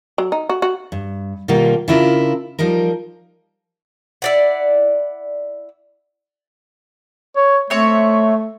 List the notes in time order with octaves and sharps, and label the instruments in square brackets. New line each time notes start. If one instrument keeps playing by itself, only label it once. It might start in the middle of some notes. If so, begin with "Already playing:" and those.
[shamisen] F#3
D#4
F#4
F#4
[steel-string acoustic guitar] G2
B2 D#3 G3 A#3 F4
C#3 D4 E4 F4 A#4
F3 G3 D#4 A#4
[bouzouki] E4 D5 F#5
[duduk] C#5
[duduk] A3 [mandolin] C4 C#5 E5